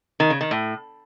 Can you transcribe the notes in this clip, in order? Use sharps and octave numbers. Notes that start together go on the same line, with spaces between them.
D#3
C#3
D#3
A2